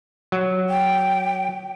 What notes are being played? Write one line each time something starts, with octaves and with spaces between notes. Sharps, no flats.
F#3
G5